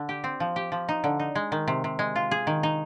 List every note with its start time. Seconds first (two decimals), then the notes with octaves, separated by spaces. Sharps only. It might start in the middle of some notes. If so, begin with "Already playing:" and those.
Already playing: D3
0.09 G4
0.24 C4
0.40 F3
0.56 G4
0.72 F3
0.89 D#4
1.04 D3
1.20 D#4
1.35 G#3
1.52 D#3
1.68 C3
1.84 C3
1.99 G#3
2.16 F4
2.31 G#4
2.47 D#3
2.63 D#4